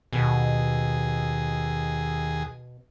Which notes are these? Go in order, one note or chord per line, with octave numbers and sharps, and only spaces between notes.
D#2 B2 G#4